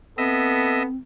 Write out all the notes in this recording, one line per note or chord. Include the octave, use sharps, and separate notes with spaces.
B3 C4 A4 D#5 E5